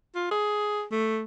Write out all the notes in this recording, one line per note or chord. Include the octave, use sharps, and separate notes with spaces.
F4
G#4
A3